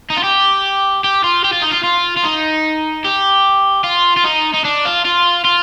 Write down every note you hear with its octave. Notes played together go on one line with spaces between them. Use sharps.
D#4
F4
G4
G4
F4
G4
F4
D#4
F4
F4
F4
D#4
G4
F4
F4
D#4
D#4
D4
F4
F4
F4